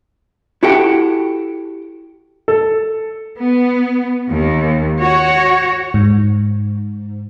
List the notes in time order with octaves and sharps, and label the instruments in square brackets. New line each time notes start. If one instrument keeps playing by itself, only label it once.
[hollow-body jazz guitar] E4 F#4 G4 A4 F#5 G5
[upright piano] A4
[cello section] B3
D#2
F#4 C#5
[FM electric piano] G#2